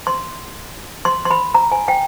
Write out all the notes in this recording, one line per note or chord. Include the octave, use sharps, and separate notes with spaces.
C6
C6
C6
B5
A#5
G#5
G5